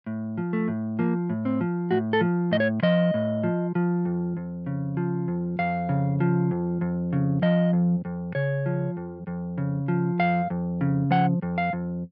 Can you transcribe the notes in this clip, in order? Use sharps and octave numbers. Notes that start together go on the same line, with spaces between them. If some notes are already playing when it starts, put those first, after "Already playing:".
A2
F3
A3
A2
F3 A#3
A2
C4
F3
A2 F#4
A4
F3
A2 D#5
C#5
F3 D#5
A2
F3
F3
F2
F2
C#3
F3
F2
F2 F5
C#3
F3
F2
F2
C#3
F3 D#5
F2
F2
C#3 C#5
F3
F2
F2
C#3
F3
F2 F5
F2
C#3
F3 F#5
F2
F5
F2